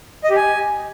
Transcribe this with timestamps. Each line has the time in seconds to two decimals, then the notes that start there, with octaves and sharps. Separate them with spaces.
0.24 D#5
0.30 G4
0.36 G#5